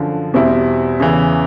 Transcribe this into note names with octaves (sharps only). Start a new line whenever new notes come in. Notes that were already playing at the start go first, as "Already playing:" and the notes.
Already playing: F#2 D3 F3
E2 B2 G3 C4 E4
E2 C#3 E3